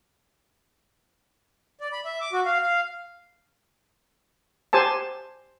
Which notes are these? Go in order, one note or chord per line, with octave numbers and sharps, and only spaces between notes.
D5
B5
E5
D6
F#4
F5
F5
G4 C5 G#5 A5